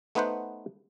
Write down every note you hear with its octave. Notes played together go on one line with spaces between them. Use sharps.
A3 B3 D#4 B4 C5 F#5